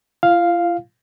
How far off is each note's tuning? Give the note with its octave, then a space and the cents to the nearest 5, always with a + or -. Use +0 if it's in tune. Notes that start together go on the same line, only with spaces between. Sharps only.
F4 -45 F5 +0